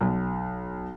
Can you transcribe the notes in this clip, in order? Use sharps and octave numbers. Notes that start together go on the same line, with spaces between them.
B1